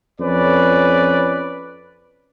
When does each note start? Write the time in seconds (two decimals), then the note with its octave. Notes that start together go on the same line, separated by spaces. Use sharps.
0.20 F2 C#4 B4 D5